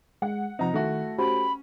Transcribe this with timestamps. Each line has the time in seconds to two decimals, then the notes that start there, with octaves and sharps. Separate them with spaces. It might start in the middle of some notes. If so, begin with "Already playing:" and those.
0.22 G#3 F#5
0.59 C3 F3 C4 D#4 A#5
0.74 D#3 A3 E4 F#4
1.19 C#4 F#4 G4 C5 B5